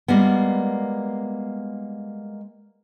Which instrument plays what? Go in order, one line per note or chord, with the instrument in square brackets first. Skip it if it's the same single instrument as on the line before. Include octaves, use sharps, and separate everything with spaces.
[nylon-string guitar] G3 G#3 A#3 B3